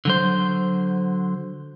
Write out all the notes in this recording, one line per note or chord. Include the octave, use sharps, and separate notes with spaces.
D3 F#3 C5